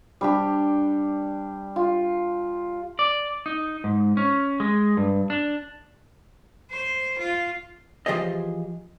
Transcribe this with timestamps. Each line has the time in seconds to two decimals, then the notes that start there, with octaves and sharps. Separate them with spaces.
0.21 G3 D4 G4
1.76 F4
2.99 D5
3.46 D#4
3.84 G#2
4.17 C#4
4.60 G#3
4.97 G2
5.30 D4
6.71 C5
7.19 F4
8.06 E3 F3 G4 G#4 C5 D#5